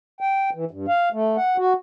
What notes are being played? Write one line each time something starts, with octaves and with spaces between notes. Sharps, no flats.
G5
E3
G2
F5
A3
F#5
F#4